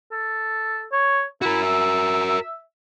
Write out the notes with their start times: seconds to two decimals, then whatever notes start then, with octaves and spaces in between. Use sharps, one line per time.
0.12 A4
0.92 C#5
1.42 E4 F#4 A#4
1.62 E5